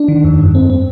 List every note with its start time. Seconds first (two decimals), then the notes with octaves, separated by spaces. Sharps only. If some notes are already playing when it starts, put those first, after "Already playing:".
Already playing: D4
0.08 D#3
0.24 F2
0.40 G2
0.55 C4
0.70 C4